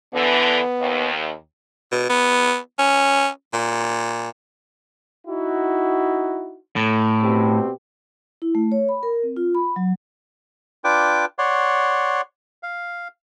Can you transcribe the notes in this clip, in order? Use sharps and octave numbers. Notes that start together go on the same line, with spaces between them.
D3 E3 B3
D#2
B2
B3
C#4
A#2
D#4 E4 F#4
A2
B2 C4 G4
E4
A3
C#5
B5
A#4
C4
F4
B5
F#3
D4 F4 B4 G5 D6
C#5 D5 F#5 C6
F5